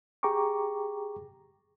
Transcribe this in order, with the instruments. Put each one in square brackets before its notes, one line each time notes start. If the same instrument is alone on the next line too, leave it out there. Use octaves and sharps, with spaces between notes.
[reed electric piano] G4 G#4 G5 A#5 C#6 D6